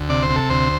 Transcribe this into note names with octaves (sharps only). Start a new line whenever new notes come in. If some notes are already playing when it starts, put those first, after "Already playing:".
Already playing: D2
C3 D5
C5
C3
A4
D2 C5